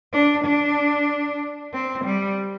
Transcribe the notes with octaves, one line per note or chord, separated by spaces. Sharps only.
D4
D4
C4
G3